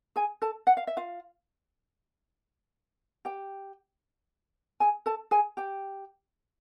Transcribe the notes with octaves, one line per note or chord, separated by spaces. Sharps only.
G#4 G#5
A4 A5
F#5
F5
E5
F4 F5
G4 G5
G#4 G#5
A4 A5
G#4 G#5
G4 G5